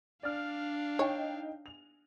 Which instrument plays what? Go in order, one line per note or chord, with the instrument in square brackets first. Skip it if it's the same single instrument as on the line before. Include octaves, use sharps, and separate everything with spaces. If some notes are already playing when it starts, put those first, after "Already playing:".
[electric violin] D4 F5 [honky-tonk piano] D5 F6
[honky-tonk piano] D#4 G5 [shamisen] C#5
[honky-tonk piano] F7